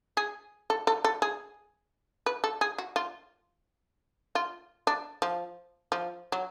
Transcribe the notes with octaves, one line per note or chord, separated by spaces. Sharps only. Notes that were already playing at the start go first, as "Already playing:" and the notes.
G#4
A4
A4
A4
G#4
B4
A4
G#4
F#4
F4
F4
D4
F3
F3
F#3